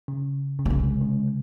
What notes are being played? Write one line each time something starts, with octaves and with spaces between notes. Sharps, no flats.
C#3
C#3
A#3
C3 G#3
C#3